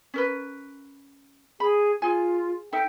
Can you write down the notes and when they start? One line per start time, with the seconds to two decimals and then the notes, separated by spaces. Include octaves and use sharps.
0.14 C#4 A#4 B4
1.60 G#4 B5
2.02 F4 G#4 G#5
2.73 D#4 A4 E5 G5